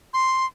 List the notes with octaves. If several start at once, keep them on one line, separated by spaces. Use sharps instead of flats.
C6